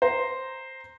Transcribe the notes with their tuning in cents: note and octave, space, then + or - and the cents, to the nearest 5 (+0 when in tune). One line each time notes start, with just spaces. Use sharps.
C5 +0 A#5 +0